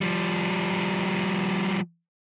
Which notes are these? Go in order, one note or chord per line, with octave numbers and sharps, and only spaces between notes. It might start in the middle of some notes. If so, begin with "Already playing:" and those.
F3 G3